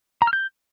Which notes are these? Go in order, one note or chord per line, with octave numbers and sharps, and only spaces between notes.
A#5
F6
G6